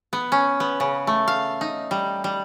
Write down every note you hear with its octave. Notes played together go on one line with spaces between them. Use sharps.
B3
C#4
B3
C#3
A3
F5
D#4
G3
G3